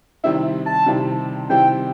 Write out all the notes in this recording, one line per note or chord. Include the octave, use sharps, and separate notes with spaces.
C3 D#3 G3 C4 E4 E5
A5
C3 D#3 G3 C4 E4
C3 D#3 G3 C4 E4 G5